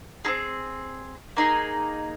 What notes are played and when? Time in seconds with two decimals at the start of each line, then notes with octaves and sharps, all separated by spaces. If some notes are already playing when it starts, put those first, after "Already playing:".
0.25 C4 D#4 G#4
1.37 A#3 D#4 G#4